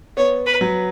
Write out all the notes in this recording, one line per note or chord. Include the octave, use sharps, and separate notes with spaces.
B3 C#5
B4
F#3